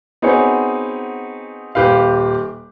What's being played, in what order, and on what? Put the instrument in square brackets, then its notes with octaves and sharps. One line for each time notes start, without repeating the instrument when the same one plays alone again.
[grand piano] B3 C4 D#4 F#4 G#4 C#5
D#1 G4 B4 F5